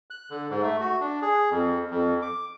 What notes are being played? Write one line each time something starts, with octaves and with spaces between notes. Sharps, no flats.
F#6
D3
G#2
A3
F#4
D4
G#4
F2
F2
D6